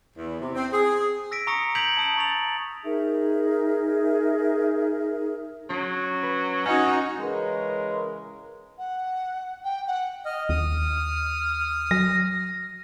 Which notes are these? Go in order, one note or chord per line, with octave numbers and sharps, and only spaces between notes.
E2
C3
C4
G#4
E6 A#6 B6 D7
A#5 C#6 D#6 A#6 C#7 D7
G6 G#6 B6 D7 F7 F#7
A5 D#6 D7 F#7
A#5 C#6 A6 F7
D#4 G#4 A#4 E5
F#3 C#4 A#6 C7
B4
C#4 D#4 F#4 F#5
C#3 E3 G#3 C#4 A#4 B4
F#5
G5
F#5
D#5 F6
D#2 D#6
F#3 A#6